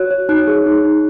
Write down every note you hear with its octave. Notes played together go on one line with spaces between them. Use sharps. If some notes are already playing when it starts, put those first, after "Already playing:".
Already playing: F#4 C#5 F#6
C#5
D#4 F#6
G#4
D#4
D#4